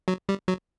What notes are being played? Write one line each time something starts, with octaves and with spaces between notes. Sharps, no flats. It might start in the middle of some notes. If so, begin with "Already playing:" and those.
F#3
G3
F#3